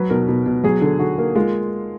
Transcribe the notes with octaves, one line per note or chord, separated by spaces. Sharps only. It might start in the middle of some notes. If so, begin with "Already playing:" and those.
Already playing: F#3 B4
B2 A#4
B2
B2
F#3 G#4
D3
D3 F#4
A#3
G#3 F4